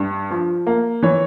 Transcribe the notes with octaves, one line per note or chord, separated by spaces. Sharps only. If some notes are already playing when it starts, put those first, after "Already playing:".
Already playing: G2
F3
A#3
E3 C#5